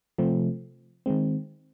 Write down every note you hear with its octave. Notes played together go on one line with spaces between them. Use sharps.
C3 F3 A3 C4
D#3 G#3 C4